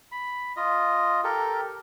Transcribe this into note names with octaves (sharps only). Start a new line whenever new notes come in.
B5
F4 D#5
G4 A4 A#4